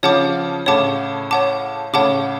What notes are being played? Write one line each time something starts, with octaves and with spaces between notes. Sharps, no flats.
C#3 F3 C#5 F#5 A5 D6
A2 C#3 C#5 F#5 A5 D6
C#5 F#5 A5 D6
A2 C#3 C#5 F#5 A5 D6